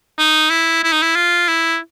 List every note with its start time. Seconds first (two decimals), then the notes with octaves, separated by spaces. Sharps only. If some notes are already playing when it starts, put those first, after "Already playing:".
0.19 D#4
0.50 E4
0.84 E4
0.92 D#4
1.02 E4
1.15 F4
1.48 E4